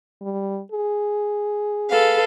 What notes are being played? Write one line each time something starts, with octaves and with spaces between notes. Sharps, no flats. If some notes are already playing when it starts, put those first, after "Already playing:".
G3
G#4
A4 B4 F5